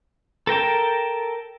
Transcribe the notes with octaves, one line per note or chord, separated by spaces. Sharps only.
A4 A#4 G5 A5